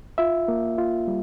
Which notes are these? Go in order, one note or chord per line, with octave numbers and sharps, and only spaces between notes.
F4 E5
A#3
F4
G3